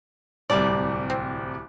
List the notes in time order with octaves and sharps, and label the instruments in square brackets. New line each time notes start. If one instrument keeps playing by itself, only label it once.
[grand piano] D1 C2 G3 [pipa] D5
[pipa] C4